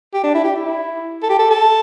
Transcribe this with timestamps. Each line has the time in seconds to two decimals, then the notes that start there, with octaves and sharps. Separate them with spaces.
0.14 G4
0.24 D4
0.34 E4
0.44 G4
0.56 E4
0.66 E4
1.23 A4
1.30 G4
1.39 A4
1.51 A4